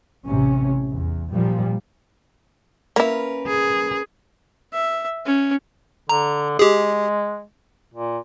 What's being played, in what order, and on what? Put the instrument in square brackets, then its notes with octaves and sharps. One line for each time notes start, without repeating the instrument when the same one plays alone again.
[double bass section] A1 A2 C3 C#4
E2
A#2 F3 G3
[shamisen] A#3 E4 [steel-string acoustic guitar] C#4 A#4 B4
[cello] G#4
[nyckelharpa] E5
C#4
[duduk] D3 [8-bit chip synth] A#5
[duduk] G#3 [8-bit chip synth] G4 G#4
[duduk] A#2